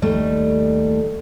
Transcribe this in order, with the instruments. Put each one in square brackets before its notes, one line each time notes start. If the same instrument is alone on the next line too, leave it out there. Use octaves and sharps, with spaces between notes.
[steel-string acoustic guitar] D#2 G3 A3